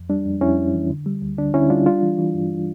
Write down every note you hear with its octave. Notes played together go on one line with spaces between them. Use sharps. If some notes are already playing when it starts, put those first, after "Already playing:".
Already playing: F2
G3 D4
F2
F2 C#4 E4
F2
E3
D3
G3
D2
D3 D4
D3 C#4 E4
G3 D4 F4
G3 D4 F4
E3
E3
G2